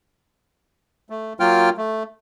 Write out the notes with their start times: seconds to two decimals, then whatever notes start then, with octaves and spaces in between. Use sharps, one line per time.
1.10 A3
1.40 F#3 A#3 F4 G5 F6
1.77 A3